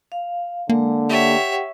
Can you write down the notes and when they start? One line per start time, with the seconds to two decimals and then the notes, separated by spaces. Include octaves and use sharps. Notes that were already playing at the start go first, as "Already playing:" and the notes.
0.12 F5
0.69 D3 G#3 A#3
1.10 G4 C#5 E5 F#5 G5